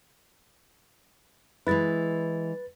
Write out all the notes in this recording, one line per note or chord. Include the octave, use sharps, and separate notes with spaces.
E3 G#3 E4 B4 A6